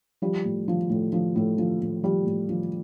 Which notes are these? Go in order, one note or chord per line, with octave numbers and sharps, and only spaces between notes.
F3 G3
A2
F3
A2
F3
A2
F3
A2
F3 G3
A2
F3